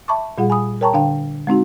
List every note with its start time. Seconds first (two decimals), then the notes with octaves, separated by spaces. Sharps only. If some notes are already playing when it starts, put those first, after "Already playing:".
0.08 E5 A5 B5 C#6 D6
0.38 A#2 G3 F4 G#4 F#5
0.50 G#5 B5 D#6
0.81 A#4 C#5 G5 A5 A#5 C#6
0.93 D3 D4 F5 G5
1.47 G#3 C4 D#4 F#4